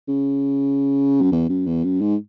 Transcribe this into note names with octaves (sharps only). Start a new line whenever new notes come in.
C#3
F#2
E2
F#2
E2
F#2
G#2